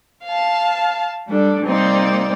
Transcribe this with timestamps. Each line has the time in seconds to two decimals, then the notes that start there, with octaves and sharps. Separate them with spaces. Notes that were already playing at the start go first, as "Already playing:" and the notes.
0.24 F5 A5
1.28 G3 D4 A4
1.64 C3 G3 A#3 C4 D#4 D5